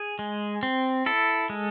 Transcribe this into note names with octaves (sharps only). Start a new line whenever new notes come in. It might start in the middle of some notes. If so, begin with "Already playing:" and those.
Already playing: G#4
G#3
C4
E4 A4
G#3